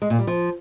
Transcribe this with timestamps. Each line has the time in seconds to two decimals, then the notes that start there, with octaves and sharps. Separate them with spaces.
0.02 G#3
0.10 A#2
0.19 G3
0.27 F3